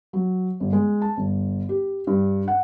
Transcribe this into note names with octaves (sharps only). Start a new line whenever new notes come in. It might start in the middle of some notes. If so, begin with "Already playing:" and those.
F#3
G1
G#3
A5
G1
G4
G2
F#5